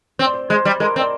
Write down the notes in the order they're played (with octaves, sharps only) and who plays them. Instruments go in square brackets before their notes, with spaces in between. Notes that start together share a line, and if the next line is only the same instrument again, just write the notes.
[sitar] C4 [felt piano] C5
[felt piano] D5
C5
[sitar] G#3 [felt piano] C5
[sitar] G3
[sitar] G#3 [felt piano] A#4
[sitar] C4
[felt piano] D5